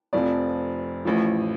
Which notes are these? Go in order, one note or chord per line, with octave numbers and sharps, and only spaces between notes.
F1 F2 F3 D5
A1 A2 F3